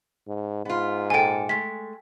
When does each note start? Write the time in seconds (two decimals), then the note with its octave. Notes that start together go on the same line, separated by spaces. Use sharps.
0.28 G#2
0.65 G#2 B3 F4
1.10 A#2 A4 G5 G#5
1.49 G#3 A3 B6